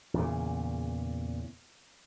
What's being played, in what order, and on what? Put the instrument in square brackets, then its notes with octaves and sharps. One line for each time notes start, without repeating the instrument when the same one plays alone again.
[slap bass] E2 A#2 C#3